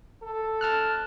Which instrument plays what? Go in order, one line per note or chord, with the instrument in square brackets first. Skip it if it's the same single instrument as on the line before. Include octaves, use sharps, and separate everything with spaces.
[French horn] A4
[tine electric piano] A5 F6 F#6